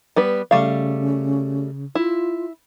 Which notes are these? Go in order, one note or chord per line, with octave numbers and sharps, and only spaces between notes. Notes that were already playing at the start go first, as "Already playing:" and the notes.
G3 B3 B4
C#3 G3 A3 F5
E4 F4